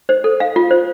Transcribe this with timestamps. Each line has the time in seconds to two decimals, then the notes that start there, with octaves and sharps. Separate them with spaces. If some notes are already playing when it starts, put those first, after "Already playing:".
0.09 C5
0.24 A4
0.40 F5
0.56 F4
0.71 C5